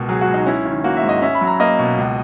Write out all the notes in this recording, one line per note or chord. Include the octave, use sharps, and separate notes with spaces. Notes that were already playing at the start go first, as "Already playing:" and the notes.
Already playing: C#2 B2 A#4
F#3 G#4
F#4
C#2
D#4
C#4 E4
D#3
A#3 F#4
E5
G#2
D#5
C#4 E5
B5
F#3
A#5
A#3 D#5
B2
C#2